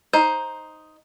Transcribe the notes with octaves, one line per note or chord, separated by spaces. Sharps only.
D#4 C5